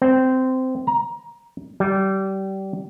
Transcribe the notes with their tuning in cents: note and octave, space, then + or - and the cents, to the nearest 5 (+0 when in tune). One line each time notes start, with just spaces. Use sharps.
C4 -15
A#5 +15
G3 -25